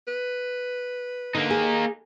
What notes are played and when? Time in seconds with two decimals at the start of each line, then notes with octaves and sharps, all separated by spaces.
0.08 B4
1.35 D3 A#3 D#4
1.50 G#4